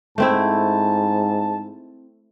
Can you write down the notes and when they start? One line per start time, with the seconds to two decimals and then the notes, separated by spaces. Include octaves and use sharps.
0.18 G#2 A3 C4 E4 A5